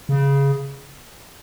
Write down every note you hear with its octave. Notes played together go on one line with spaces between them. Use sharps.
C#3